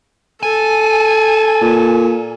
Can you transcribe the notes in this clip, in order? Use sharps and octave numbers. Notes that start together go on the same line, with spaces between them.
A4 G#5
A#2